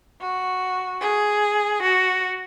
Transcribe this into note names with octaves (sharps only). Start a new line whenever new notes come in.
F#4
G#4
F#4